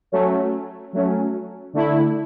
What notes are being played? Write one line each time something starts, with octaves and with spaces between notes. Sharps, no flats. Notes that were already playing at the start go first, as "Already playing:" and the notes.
F#3 A3 C#4
F#3 A3 C#4
D3 A3 E4